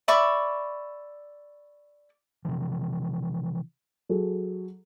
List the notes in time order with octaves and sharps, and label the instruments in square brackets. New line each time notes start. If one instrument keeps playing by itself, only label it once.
[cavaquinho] D5 E5 B5 C#6
[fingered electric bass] C3 E3 F3
[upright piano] F#3 G#4 A4